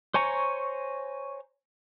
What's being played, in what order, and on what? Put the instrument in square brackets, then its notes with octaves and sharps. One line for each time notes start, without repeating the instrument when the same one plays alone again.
[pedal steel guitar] C5 C#5 G#5 A#5 C#6